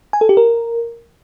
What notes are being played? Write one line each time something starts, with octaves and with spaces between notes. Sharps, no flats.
G#5
A4
G4
A#4